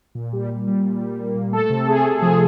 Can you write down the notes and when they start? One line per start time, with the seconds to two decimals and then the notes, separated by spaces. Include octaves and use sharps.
0.15 A#2
0.33 G3
0.50 G3
0.67 G3
0.85 A#2
1.02 G3
1.19 A#3
1.35 A#2
1.53 A3 A4
1.70 C3
1.88 A3 G#4
2.05 C3
2.22 F3 G#4